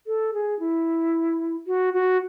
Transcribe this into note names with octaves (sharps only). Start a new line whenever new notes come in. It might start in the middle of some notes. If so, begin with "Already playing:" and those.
A4
G#4
E4
F#4
F#4